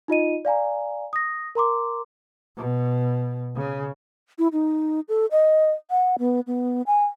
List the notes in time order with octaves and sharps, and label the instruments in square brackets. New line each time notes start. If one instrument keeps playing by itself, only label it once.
[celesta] D#4 F4 D#5 D#7
D5 F5 G#5 A#5
D#6 A#6
A#4 A#5 C6 D6
[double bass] B2
C#3
[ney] E4
D#4
A4
D#5
F#5
B3
B3
G#5